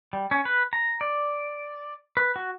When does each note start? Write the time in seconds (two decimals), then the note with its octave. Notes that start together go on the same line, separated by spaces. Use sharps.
0.13 G3
0.31 C#4
0.45 B4
0.73 A#5
1.01 D5
2.17 B4
2.36 F#4